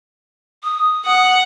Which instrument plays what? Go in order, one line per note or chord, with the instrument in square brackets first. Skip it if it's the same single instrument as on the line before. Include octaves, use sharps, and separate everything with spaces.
[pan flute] D#6
[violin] F#5